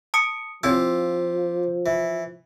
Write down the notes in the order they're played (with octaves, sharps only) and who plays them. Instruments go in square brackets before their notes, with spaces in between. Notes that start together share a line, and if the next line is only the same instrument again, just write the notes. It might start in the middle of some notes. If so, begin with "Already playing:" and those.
[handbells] A5 D#6 C#7
[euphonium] F3 [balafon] C4 E4 C#5 [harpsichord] F4 G4 [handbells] E6
[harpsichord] E3